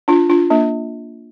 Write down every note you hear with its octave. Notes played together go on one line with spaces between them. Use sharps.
D4 F4
D4 F4
A#3 D4